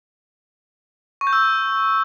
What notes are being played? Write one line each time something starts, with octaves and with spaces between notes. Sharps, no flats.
C#6
G6
E6